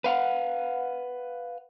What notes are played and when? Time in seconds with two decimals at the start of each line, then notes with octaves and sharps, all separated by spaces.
0.04 B4 F5 F#5